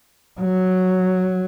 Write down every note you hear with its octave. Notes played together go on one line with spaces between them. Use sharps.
F#3